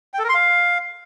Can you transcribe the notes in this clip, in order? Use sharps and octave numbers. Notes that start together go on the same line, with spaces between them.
G5
A4
A#4
C6
F5